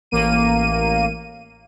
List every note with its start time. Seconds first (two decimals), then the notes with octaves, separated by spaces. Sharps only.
0.11 A1 A#3 D#7